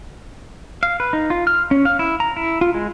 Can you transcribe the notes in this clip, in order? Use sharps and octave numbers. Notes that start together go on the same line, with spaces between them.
F5
B4
D#4
F4
F6
C#4
F5
E4
A#5
E4
F4
G#3